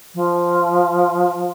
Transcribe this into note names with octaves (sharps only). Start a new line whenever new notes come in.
F3